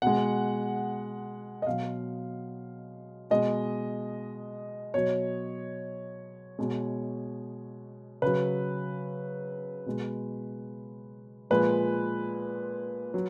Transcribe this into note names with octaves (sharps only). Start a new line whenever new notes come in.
B2 G#3 F#5
D#5
B2 F#3 F5
B2 G#3 D#5
B2 F#3 C#5
B2 G#3
C#3 F#3 B4
B2 G#3
A#2 F3 G#3 B4
F#3